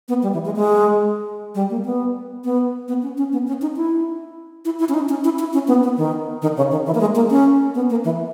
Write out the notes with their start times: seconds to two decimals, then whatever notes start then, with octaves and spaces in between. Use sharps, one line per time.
0.09 B3
0.23 G3
0.33 E3
0.45 G#3
0.56 G#3
1.55 G3
1.70 A#3
1.85 B3
2.44 B3
2.88 B3
3.02 C#4
3.18 C#4
3.33 B3
3.47 C#4
3.62 D#4
3.76 E4
4.65 E4
4.79 E4
4.89 C#4
4.94 D#4
5.09 C#4
5.24 E4
5.39 E4
5.53 C#4
5.68 B3
5.83 B3
5.98 D#3
6.42 D#3
6.57 C#3
6.71 D#3
6.86 E3
6.95 A#3
7.01 G#3
7.15 A#3
7.30 C#4
7.75 B3
7.90 A#3
8.04 E3